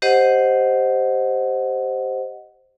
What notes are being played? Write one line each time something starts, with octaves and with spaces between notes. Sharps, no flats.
G4 C5 D#5 F#5